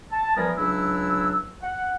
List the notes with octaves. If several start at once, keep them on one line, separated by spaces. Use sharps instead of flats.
A5
E3 F3 G3 B3 G#4 A#4
C#2 F#3 D4 E4 E6
F#5